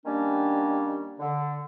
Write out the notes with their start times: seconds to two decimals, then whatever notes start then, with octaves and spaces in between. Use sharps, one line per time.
0.05 D#3 G3 A#3 C#4 D4
1.19 D3